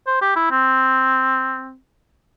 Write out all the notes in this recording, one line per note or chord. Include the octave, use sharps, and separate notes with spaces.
C5
G4
E4
C4